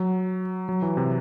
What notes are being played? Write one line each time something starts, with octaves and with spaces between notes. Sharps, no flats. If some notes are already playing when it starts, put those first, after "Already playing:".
Already playing: F#3
F#3
E3
C3